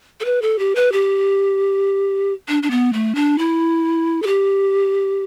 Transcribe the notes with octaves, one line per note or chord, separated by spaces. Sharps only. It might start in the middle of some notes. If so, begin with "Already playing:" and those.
A4
B4
A4
G4
B4
G4
D4
D4
B3
A3
D4
E4
A4
G4